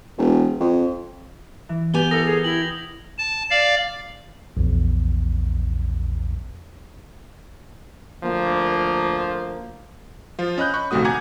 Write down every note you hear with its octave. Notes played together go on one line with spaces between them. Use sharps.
E1
F2
E3
B3 G4 D5 G#5 D6 G6 F7 G7
E4 A4 A#4 D#6 A#6 F7
G#4
E4 G5 F#7
A5
D5 F5
A#1 E2
D2 F3 A#3
F3 F4
C#4 D#5 B5 F#6 G6
B5 C#6
A#1 D#2 C3 A3 F#4 D#6
F#5 G#5 A#5 D6 G#6